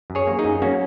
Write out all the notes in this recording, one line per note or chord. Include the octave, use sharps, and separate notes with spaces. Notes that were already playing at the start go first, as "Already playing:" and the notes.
F#2
G#4 C#5
A#3
D#4 G#4
F#2
A#3 C#4 F#4